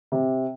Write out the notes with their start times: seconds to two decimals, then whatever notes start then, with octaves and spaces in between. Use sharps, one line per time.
0.12 C3